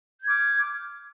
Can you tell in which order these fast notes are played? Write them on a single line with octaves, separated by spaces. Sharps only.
G6 G#6 D6 F6